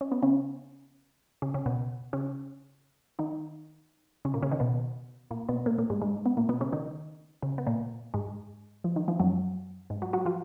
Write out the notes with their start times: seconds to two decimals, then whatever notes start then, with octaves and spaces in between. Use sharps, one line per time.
0.01 C#4
0.12 B3
0.23 C#3 C#4
1.42 C#3 C#4
1.54 C#3 C#4
1.66 B2 B3
2.13 C#3 C#4
3.19 D#3 D#4
4.25 C#3 C#4
4.34 A#2 A#3
4.42 C#3 C#4
4.52 D#3 D#4
4.60 B2 B3
5.31 A#2 A#3
5.49 B2 B3
5.66 A#2 A#3
5.78 A#2 A#3
5.90 G#2 G#3
6.02 G#2 G#3
6.26 B3
6.37 A#2 A#3
6.49 B2 B3
6.61 C#3 C#4
6.72 D#3 D#4
7.43 C#3 C#4
7.58 B3
7.67 A#2 A#3
8.14 G#2 G#3
8.84 F3
8.96 D#3
9.08 F3
9.20 F#2 F#3
9.90 G#2 G#3
10.02 F#3 F#4
10.13 F#3 F#4
10.25 F3 F4